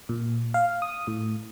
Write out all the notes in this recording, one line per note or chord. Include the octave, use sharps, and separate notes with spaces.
A#2
F5
D#6
A2